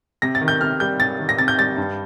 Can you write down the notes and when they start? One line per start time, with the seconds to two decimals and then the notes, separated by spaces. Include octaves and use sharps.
0.22 C3 A#6
0.35 A6
0.41 D#3
0.48 G6
0.61 C3 F6
0.80 G3 G6
0.99 C3 A6
1.19 D#3
1.29 A#6
1.38 C3 A6
1.48 G6
1.59 G3 A6
1.77 G2